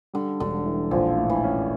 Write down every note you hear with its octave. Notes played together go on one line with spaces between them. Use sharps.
D3 G3
E1 D3
E3
A#1 F3
A2
E3
C#4